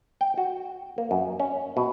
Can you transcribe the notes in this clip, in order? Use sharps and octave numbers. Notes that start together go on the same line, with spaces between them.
G5
F#4
A#3
F#2
C#4
B2